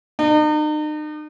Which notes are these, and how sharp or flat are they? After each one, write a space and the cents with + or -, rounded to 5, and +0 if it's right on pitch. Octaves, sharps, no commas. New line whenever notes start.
D#4 -40